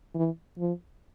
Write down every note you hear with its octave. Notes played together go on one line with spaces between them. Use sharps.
E3
F3